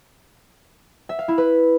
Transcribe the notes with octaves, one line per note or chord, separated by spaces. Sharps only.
E5
F5
E4
B4